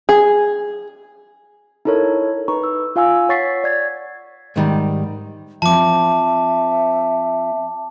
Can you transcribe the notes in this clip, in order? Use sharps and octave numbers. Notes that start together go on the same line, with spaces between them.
G#4
D#4 E4 A4 A#4 C#5
D#4 B4 A#5 C#6
E6
F4 F5 G#5 E6
C#5 F#5 C#6 A6 B6 C7
D5 G#6 A6
G#2 D#3 G3
F3 C4 E5 A5 D6